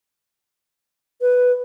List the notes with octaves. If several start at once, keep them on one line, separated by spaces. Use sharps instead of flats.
B4